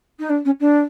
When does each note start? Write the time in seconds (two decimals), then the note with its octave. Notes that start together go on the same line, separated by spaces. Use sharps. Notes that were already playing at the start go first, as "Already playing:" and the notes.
0.19 D#4
0.29 D4
0.45 C#4
0.60 D4